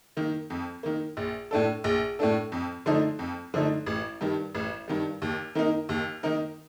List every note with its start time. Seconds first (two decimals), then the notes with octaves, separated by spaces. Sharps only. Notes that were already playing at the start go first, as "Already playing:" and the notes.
0.17 D#3 A#3
0.50 F2
0.83 D#3 A#3
1.17 A#1
1.51 A2 A3 D4 A4
1.84 A#1
2.19 A2 A3 D4 A4
2.52 F2
2.86 D3 F3 A3 D#4
3.19 F2
3.54 D3 F3 A3 D#4
3.86 A1
4.21 G2 D#3 G3
4.55 A1
4.88 G2 D#3 G3
5.22 D#2
5.55 D#3 A#3 D#4 A#4
5.89 D#2
6.23 D#3 A#3 D#4 A#4